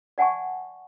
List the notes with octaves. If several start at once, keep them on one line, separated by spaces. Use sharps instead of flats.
D5 F#5 G#5 A5 C#6